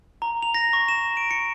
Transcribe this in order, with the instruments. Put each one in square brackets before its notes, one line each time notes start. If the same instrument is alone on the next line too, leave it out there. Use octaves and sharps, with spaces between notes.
[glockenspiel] A#5
F7
A#6
C#6
E7
D7
C#7